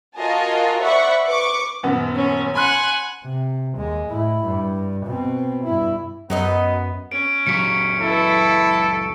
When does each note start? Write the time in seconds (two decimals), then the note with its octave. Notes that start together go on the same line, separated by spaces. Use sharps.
0.16 F4 F#4 A#4 D#5 G#5 A5
0.82 C5 D5 E5 F#5 B5 C#6
1.26 B4 C#6 D6
1.83 D#1 F#2 B3
2.15 C#4
2.55 F#5 G#5 B5 C6 F#6
3.25 C3
3.77 D#2 G#3
4.09 A2 E4
4.46 G2
5.06 B2 C4
5.64 G2 E4
6.30 F#2 F#3 B3 D#4 D#5
7.12 C#4 D7
7.47 C#2 F#3 C#6 B6 C#7
8.01 E4 A4 B4